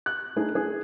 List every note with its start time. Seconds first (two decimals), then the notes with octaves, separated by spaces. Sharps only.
0.06 F#6
0.36 A3 D4 D#4 G#4
0.55 G#4